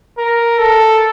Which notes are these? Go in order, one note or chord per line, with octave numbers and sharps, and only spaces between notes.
A#4
A4